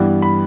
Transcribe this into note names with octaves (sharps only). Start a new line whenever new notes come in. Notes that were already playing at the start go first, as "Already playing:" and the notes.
Already playing: G2 E3 G3 B3
B5